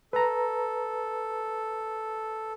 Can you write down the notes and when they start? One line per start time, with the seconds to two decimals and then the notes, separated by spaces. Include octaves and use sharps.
0.13 A4 B4 A#5